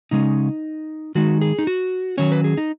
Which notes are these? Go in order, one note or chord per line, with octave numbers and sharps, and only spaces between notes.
C#3 G#3 C#4 D#4
D#3 G#3 D#4 F#4
G#4
D#4
F#4
D#3 F#3 C#4 C#5
B4
G#4
D#4